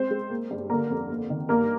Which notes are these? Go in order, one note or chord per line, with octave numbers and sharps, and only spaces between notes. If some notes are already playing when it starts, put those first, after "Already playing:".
Already playing: G#3 C4 C5
G#3
A#3
G2
D3 A#3 A#4
F2
A#3
D#3
G2 A#3 A#4